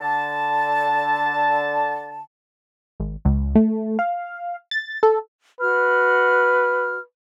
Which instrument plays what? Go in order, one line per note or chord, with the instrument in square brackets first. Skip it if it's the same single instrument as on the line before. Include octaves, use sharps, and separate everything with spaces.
[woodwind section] D3 A5
[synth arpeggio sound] G#1
C#2
A3
F5
A6
A4
[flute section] F#4 F6 [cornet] B4